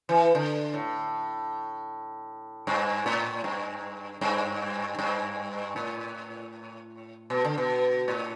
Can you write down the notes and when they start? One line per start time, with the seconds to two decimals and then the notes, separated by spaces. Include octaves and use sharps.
0.09 E3
0.35 D3
0.74 A2
2.67 G2
3.06 A2
3.44 G2
4.21 G2
4.99 G2
5.76 A2
7.30 B2
7.45 D3
7.58 B2
8.08 A2